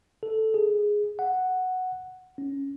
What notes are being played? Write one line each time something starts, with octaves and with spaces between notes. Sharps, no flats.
A4
G#4
F#5
C#4